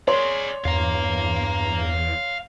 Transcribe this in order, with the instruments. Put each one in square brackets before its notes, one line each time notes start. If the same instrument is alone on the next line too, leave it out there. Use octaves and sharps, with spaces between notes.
[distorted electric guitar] G#4 D5 [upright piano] C#5 C6
[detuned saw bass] E2 [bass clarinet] G2 [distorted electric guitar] F5 A#5